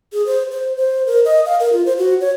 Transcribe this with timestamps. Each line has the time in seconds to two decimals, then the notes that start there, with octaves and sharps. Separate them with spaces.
0.13 G#4
0.26 C5
0.51 C5
0.77 C5
1.06 A#4
1.25 D#5
1.46 F5
1.60 A#4
1.73 F4
1.86 C5
1.98 F#4
2.21 C#5